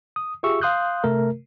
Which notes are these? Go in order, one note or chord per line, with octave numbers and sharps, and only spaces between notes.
D#6
F4 G4 G#4 E5 C#6 E6
F5 C6 D#6 F#6 G6
C3 A3 A#4